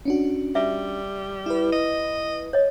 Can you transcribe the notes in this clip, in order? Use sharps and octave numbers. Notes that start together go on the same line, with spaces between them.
C#4 D4 F#4
G3 E5
E4 B4
D#5
C#5 D#5